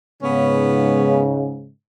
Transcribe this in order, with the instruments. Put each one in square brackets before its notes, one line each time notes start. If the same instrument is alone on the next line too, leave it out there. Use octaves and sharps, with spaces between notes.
[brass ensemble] G#2 C#3 [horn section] B3 C#4